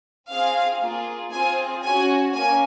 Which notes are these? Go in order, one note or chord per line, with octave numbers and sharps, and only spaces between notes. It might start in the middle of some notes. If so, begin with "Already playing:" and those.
C4 F4 G#4 F5
A#3 F4 G#4
C4 F4 G#4 G#5
C#4 F#4 G#5
A#3 C#4 G#5